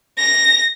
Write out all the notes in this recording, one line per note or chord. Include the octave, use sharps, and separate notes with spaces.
A#6